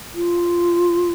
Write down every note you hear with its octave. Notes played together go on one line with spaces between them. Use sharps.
F4